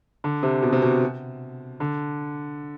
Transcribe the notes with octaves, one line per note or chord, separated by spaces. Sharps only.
D3
C3
B2
C3
B2
D3